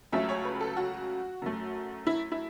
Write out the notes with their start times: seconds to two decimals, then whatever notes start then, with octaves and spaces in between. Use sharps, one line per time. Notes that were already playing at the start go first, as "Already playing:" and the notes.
0.12 C#2 C#3 F#3 A3 E5
0.29 C#5
0.45 B4
0.60 A4
0.77 F#4
1.42 F#2 F#3 A3
2.07 E4
2.32 E4